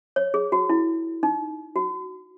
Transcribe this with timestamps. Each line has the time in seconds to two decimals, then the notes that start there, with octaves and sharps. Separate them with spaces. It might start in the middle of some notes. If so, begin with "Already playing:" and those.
0.16 C#5
0.34 G#4
0.52 F#4
0.69 E4
1.23 D#4
1.76 F#4